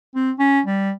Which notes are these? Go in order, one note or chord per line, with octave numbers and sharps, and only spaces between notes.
C4
C#4
G3